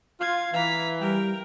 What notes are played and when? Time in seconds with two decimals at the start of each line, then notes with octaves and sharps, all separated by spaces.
0.21 F4 F5 G#6
0.53 E3 F5 A#5 B6
1.01 G3 A#4 G5